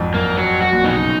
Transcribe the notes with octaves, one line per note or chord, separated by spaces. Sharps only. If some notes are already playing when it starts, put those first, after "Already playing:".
Already playing: G#1 F2 G#2
F#2 A#3
F#3
F#2 F#4
A#1 A#2
B1 B2 D#4
C#3